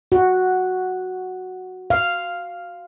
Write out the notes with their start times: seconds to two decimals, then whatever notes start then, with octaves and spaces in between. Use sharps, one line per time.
0.12 F#4
1.90 F5